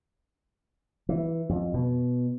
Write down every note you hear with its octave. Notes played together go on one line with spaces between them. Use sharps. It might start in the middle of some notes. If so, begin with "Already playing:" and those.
E3
F2
B2